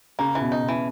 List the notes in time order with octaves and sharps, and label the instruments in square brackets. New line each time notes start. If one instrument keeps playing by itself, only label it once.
[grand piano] C#3 [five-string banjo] A#3
[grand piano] C#3 [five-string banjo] E3
[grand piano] B2
[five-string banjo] D#4
[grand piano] B2
[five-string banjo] E3